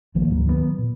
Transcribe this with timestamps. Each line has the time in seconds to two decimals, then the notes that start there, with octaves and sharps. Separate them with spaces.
0.15 A#1 D#3 F3 A#3
0.28 D2 G#2 F#3 G3
0.46 D#3 F#3 G3 B3
0.79 A#2